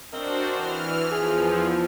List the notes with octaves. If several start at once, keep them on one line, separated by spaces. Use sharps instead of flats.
C4 D4 F#4 A#4 C5 D#5
E3 F6
E2 E3 F3 G#4